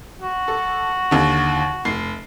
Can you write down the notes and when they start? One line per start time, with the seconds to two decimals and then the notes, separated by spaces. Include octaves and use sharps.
0.22 F#4
0.48 A4
1.11 D#2 D3
1.85 F1 C7